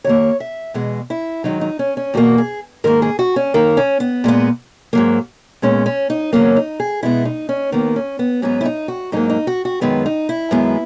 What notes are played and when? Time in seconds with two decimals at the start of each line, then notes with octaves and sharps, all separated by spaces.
0.04 D#2 D#3 A#3 C#5
0.40 E5
0.74 E2 B2 G#3
1.10 E4
1.44 G#2 D#3 F#3 D#4
1.61 D#4
1.79 C#4
1.97 C#4
2.14 E2 B2 A#3 F#4
2.38 G#4
2.84 G#2 D#3 A#3 A#4
3.02 G#4
3.19 F#4
3.36 C#4
3.54 F#2 D#3 A#3
3.77 C#4
4.00 B3
4.24 A#2 G#3 B3
4.93 G#2 F#3 A#3
5.62 A#2 G#3 B3 C#4
5.86 C#4
6.10 D#4
6.33 E2 C#3 F#3 A#3 C#4
6.56 D#4
6.80 G#4
7.03 B2 G#3 B3 E4
7.25 D#4
7.49 C#4
7.72 D#2 D#3 A#3 B3
7.96 C#4
8.19 B3
8.42 G#2 F#3 B3 C#4
8.61 E4
8.65 D#4
8.88 F#4
9.12 G#2 F#3 A#3 D#4
9.29 D#4
9.47 F#4
9.65 F#4
9.81 F#2 D#3 G#3 B3 B4
10.06 D#4
10.29 E4
10.51 F#2 D#3 G#3 B3